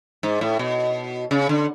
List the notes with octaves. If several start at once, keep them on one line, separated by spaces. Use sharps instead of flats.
G#2
A2
B2
C#3
D3